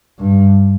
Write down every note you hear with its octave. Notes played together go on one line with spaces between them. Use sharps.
G2